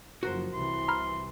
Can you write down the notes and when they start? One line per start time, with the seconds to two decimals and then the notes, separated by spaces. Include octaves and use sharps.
0.23 F#1 F3 F#4 A#4 C5
0.53 C2 C3 E3 C6
0.88 A#5 B5 F6